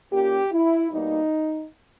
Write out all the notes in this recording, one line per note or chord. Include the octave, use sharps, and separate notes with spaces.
A#2 A#3 C#4 G4
E4
B2 G3 A#3 D#4